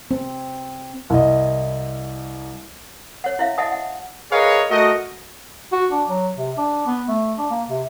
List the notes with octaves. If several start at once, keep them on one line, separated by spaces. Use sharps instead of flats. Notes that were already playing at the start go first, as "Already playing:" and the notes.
C4
C2 D#5
C#5 F#5
E4 C#5 E5 F5
D#5 E5 F#5 G#5 A5 D#6
F#5
G#4 A#4 B4 C#5 D#5 F5
A3 F#4 A#4 D#5
F#4
D4
F#3
C3
D4
B3
A3
D4
A#3
C3